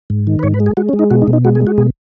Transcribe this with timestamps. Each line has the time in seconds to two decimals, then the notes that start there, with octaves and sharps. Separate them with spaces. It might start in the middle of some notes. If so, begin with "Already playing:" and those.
0.10 G#2
0.27 D#3
0.39 B4
0.43 G#2 C#5
0.54 B4
0.60 G#3
0.66 G#4
0.77 G#3 F#4
0.89 C#4
0.93 G#3
0.99 D#4
1.10 B2 F#4
1.22 D#4
1.28 B2
1.33 D#4
1.45 G#3 F#4
1.55 G#4
1.61 G#3
1.67 F#4
1.78 B2 G#4